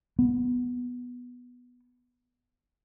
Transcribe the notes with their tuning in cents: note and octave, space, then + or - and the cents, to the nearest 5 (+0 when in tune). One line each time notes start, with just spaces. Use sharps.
B3 -5